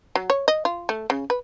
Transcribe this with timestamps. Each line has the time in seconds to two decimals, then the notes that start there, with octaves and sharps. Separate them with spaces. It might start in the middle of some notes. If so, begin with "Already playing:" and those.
0.15 F#3
0.30 C#5
0.48 D#5
0.65 F4
0.89 A3
1.10 C#3
1.30 B4